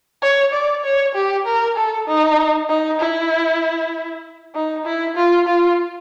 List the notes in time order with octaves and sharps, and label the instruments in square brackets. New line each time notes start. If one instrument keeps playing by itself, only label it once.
[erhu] C#5
D5
C#5
G4
A#4
A4
D#4
D#4
E4
D#4
E4
F4
F4